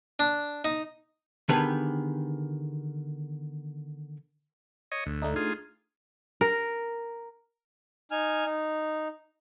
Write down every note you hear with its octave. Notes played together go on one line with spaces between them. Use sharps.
D4
D#4
D3 D#3 B3 G4 G#4 B4
C#5 D#5
D2
A3 D4 D#4
F4 G#4
A#4
D#4 G#5 F6
D#4